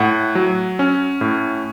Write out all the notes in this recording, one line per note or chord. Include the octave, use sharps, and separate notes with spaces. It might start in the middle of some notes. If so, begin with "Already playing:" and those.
Already playing: A2 F#5
F#3
C#4
A2